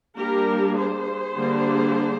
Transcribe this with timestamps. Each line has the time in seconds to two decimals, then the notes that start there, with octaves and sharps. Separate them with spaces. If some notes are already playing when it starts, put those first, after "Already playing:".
0.17 G3 A#3 D4 G4 A#4
0.76 G#4 C5
1.36 D3 G3 A#3 D4